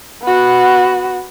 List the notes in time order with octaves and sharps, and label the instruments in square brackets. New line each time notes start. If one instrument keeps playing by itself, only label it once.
[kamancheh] B3 F#4